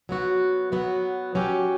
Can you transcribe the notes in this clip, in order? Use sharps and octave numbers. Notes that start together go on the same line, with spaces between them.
F#3 B3 F#4
F#3 B3 F#4
F#3 C#4 G4